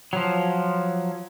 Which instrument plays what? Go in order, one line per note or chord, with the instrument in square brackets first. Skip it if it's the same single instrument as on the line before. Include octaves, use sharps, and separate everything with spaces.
[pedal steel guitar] F3 F#3